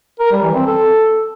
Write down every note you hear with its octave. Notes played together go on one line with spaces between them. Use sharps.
A#4
G3
E3
C4
A4